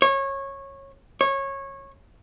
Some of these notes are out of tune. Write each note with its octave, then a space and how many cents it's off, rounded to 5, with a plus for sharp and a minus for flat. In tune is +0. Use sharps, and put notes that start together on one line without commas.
C#5 -20
C#5 -20